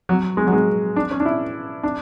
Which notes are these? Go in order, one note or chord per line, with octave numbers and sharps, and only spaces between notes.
F#3
G#3
F#3
G#3
D4
C#4
D4
E4
D4